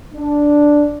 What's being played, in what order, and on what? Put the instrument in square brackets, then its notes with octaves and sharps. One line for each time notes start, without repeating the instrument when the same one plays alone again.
[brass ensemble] D4